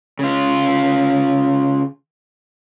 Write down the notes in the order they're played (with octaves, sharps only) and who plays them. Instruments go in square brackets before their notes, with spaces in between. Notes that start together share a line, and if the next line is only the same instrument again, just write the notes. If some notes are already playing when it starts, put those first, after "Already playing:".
[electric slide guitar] C#3 F4